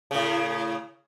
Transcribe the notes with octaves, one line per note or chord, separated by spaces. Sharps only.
A2 C#3